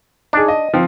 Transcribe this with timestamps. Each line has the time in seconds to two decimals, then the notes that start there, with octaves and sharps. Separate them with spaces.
0.33 D4 D#4 G#4
0.48 D#5
0.74 F3 C4